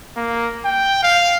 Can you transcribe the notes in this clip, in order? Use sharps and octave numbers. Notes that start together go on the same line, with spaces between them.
A#3
G5
F5